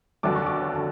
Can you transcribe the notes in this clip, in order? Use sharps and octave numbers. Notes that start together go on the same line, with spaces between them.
F1 D#2 D3 F#3 D6
C#6
D6
D3